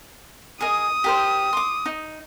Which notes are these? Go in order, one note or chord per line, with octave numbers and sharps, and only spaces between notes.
G#4 A#4 D#5 D#6
G4 A#4 C5
C6 D6
D#4